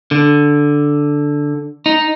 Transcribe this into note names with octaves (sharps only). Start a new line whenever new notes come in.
D3
D#4